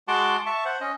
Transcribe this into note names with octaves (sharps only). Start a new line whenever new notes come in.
G#3 F#4 F#5 A5 C6 D6
E5 A5 C#6
C5 F#5
C#4 D#5